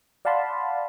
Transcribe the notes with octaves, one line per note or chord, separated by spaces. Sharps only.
D5 F5 F#5 A5 B5 C6